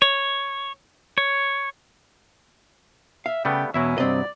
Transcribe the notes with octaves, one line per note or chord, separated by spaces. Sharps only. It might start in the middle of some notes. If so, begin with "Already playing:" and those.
C#5
C#5
E5 F5
C#3 G3 A3 B3 G4
E2 B2 F#3 B3 C#4 E4 E5
G2 C3 C4 D5 D#5